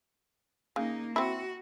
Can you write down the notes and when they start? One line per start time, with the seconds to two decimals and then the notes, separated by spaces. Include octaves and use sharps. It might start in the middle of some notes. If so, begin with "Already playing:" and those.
0.76 C#3 A#3 D#4
1.16 C4 E4 F#4